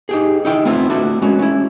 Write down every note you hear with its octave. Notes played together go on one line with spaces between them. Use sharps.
D#4 G4 G#4
D#4 E4 G5
A3 B3 C4 E4 F4
A3 D4 E4 F#4
G#3 C#4 F#4
C#4 E4